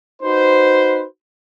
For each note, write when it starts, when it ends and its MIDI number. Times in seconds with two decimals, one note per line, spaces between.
0.22 1.04 63
0.22 1.04 66
0.22 1.04 71
0.22 1.04 72